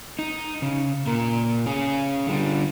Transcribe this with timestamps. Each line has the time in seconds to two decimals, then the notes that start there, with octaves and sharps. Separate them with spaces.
0.19 D#4
0.62 C#3
1.06 A#2 A#4
1.66 C#4 G#4
2.27 D3 G3